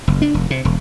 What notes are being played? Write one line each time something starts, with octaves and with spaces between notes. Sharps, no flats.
F#1
D4
F1
C3
E1